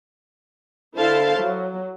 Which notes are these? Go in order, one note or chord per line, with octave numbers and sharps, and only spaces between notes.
D3 E4 A4 C5 F5 A5
F#3